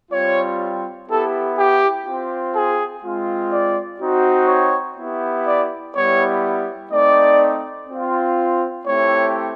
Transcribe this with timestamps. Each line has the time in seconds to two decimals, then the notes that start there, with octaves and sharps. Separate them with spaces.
0.11 G3 C4 F4 C#5
1.08 B3 E4 G4 A4
1.57 G4
2.05 C4 F4
2.54 G#4
3.02 G#3 C4 F4
3.51 D5
4.00 C4 D#4 F#4
4.48 C#5
4.97 B3 E4 G4
5.46 D5
5.94 G3 B3 E4 G4 C#5
6.91 A3 C4 D#4 D5
7.88 C4 F4
8.85 A3 C4 E4 G4 C#5